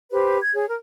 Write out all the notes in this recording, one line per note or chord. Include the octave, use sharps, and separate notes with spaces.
G4 B4 C5
G#6
G#4 C#5
A#4